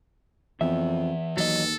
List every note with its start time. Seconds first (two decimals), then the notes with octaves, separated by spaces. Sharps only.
0.61 F2 E3 B3 E5
1.37 D#2 F#3 A4 D#5